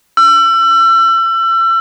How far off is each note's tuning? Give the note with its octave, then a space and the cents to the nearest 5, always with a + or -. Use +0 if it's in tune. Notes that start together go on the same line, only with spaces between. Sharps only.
E6 +35